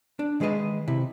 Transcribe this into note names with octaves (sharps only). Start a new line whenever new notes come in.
D4
D#3 G#3 G#4 B4 D#5
C3 E4